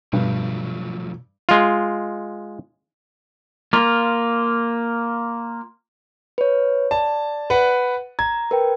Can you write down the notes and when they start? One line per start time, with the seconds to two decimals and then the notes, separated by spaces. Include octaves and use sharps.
0.13 G2 B2 F3 F#3 A3
1.49 G#3 F4
3.73 A#3 F4
6.38 B4 C#5
6.91 D5 A5
7.50 B4 F#5
8.19 A#5 G#6
8.51 A#4 B4 G5